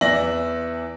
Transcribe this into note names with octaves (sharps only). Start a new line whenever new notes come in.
E2 E3 D5 E5 A#6 F#7